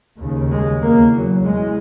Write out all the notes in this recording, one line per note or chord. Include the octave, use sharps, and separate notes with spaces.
D#2 C#3
G#3
E2 C#3 A#3
F#3
E2 C#3 G#3